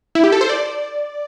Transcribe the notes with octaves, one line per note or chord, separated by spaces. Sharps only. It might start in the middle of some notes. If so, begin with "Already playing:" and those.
E4
G4
A4
C5
D5